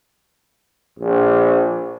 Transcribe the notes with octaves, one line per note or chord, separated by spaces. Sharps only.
A#1